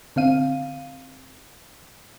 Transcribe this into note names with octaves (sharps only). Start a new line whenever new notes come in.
D3 C4 F5 D#7